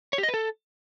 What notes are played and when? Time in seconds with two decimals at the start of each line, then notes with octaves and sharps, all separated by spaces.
0.13 C#5
0.18 G4
0.23 D#5
0.29 B4
0.34 A4